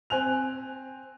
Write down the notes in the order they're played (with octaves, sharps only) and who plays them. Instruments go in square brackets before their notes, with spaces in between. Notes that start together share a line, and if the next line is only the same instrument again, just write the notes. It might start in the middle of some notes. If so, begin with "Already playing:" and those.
[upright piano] C4 G#5 F#6 F7